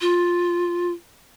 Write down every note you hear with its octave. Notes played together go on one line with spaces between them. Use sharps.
F4